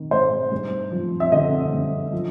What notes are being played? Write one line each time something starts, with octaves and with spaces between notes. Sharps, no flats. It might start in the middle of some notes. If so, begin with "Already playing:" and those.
Already playing: D#3
G#2 C5
G2
F3
E5
D3 D#5
G2
F3